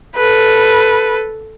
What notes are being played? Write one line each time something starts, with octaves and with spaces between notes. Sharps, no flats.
A4 B4